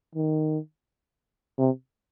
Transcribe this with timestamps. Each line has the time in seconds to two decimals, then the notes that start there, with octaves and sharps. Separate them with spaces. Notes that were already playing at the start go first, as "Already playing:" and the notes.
0.15 D#3
1.58 C3